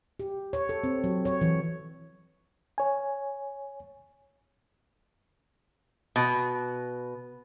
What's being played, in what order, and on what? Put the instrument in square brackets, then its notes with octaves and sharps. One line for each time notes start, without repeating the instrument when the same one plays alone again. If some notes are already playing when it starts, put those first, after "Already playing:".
[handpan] G4
C#5
A4
C4
F#3
C#5
E3
[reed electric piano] C#5 G#5
[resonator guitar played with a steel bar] B2